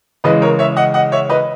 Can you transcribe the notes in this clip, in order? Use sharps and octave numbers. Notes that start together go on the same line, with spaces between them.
C#3 E3 G#3 B4 D#5
A#4 C#5
C#5 E5
D#5 F#5
D#5 F#5
C#5 E5
B4 D#5